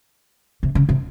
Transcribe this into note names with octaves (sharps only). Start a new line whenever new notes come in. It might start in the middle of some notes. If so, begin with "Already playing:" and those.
C3
C#3
C3